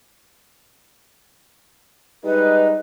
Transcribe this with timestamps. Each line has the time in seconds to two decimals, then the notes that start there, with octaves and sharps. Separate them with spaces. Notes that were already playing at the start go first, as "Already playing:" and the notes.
2.24 G3 G#3 D#4 B4